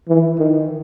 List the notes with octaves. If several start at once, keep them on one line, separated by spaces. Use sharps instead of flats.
E3
D#3